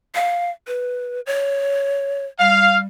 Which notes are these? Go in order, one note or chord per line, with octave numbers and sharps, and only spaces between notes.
F5
B4
C#5
G3 F5